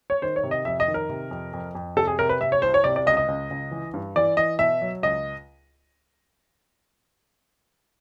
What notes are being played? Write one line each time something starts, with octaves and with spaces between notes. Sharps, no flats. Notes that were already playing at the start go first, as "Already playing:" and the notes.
C#5
D#3 C5
C#5
C3
D#5
F2 E5
D#5
D#3
A#4
C3
F2
F2
F2
C3 A4
G#4
C3 A#4
B4
C3 E5
C#5
C2 C5
C#5
C3 D5
D5
C#2 D#5
D#5
C#2
C#2
E3
G2
E3 D5
E3 D#5
B2 E5
F#3
C#2 D#5